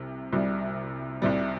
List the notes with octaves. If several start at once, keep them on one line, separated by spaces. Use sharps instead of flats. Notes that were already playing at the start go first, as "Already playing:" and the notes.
Already playing: C2 C3
C2 C3 G3
C2 C3 G3